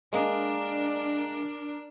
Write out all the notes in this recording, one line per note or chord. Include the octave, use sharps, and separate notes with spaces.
G#3 A#3 D4 A#4 D#5